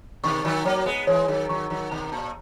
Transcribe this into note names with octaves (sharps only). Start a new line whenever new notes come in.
B2 D#3 C#6
D#3 F#3
F#3 A#3 C#5
G#3 B3
E3 G#3 C#5
D#3 F#3
D#3 F#3 C#6
D#3 F#3
B2 D#3 A#5
A#2